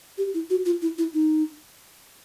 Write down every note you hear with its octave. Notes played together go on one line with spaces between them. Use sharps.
G4
E4
F#4
F4
E4
E4
D#4